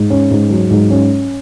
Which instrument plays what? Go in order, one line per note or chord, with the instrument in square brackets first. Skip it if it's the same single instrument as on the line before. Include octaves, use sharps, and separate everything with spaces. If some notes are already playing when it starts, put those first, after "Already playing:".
Already playing: [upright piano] G#2
C#4
G#2
F#3
G#2
C#4